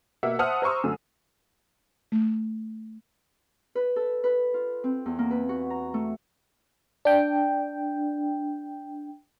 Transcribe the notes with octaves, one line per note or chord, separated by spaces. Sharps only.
B2 A#3 E5 F#5 E6
C5 E5 F#5 A5 D#6 F6
C5 A#5 C6 C#6 E6
F#2 D3 A3 D#6
A3
B4
A4
B4
F4
C4
E2
A#3
B4
F#4
A#5
A3
D4 G5